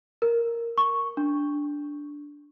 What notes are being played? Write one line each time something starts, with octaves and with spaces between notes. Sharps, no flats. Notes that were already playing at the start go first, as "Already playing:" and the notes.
A#4
C#6
D4